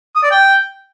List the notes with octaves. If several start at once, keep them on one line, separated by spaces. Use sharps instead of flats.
D#6
D5
G5